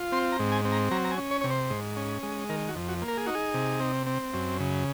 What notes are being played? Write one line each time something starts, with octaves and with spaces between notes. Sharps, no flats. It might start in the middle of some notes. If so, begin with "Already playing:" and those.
Already playing: F4
C4 C6
A#5
G#2
G#5
C4
A#5
F#3 A#5
A#5
G#5
C#4
C#5
C3 C#5
C5
G#2
C#4
G#3
D#3 A#4
F#4
F2
F#4
A#3
A#4
G#4
D#4 F#4
G#4
C3
C4
C4
F#2
C#3